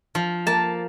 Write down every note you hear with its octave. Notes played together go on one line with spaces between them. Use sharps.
F3
A#3 A5